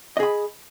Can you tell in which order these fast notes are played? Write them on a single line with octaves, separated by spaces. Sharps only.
D#5 G#4 B5